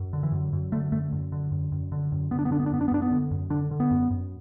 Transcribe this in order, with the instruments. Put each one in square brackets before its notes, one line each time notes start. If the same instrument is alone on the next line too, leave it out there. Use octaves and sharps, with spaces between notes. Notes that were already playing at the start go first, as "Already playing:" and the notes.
Already playing: [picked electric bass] F#2
D3
E3
F#2
F#2
D3 A3
F#2 A3
F#2
D3
F#2
F#2
D3
F#2
D3 B3
D4
B3
D3 D4
B3
D4
F#2 B3
D4
B3
F#2 D4
B3
D3
F#2
D3 D4
D3
B3
F#2
F#2